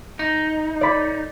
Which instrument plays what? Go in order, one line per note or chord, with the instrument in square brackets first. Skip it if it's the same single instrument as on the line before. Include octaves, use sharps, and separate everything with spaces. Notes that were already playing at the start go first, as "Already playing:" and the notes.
[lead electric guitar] D#4
[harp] D5 B5